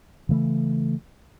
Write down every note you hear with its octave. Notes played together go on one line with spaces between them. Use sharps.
C#3 E3 A3